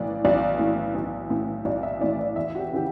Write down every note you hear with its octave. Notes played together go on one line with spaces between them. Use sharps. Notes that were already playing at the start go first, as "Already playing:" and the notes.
Already playing: B1 A2 E3 D5
B1 D5
A2 E3
B1
A2 E3
B1 D5
E5
A2 E3 D5
D5
E2 E5
F#4
G4
C#3 E3 G4